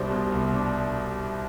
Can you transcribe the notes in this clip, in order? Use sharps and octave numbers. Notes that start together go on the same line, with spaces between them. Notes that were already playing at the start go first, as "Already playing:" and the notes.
Already playing: C2 B2 G3 D4 C5
B2
C2
D4